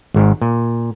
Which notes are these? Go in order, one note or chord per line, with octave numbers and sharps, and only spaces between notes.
G#1 G#2 D#3
A#2